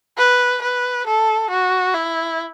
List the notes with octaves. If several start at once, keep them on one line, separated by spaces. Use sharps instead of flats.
B4
B4
A4
F#4
E4